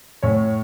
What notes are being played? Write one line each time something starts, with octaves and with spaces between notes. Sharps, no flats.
A2 C#5